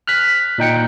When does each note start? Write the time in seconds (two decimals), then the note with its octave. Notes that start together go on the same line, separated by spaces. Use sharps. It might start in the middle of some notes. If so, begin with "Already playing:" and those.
0.07 F6 F#6 B6
0.58 A#2 D#4 G5 C#7